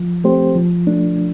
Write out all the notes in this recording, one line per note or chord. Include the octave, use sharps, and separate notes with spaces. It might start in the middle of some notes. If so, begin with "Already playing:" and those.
Already playing: F3
A3 C4 G4 C5
F3
A3 D4